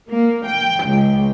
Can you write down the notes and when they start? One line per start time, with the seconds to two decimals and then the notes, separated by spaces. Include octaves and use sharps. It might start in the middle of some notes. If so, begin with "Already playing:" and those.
0.10 A#3
0.49 G5
0.86 C#2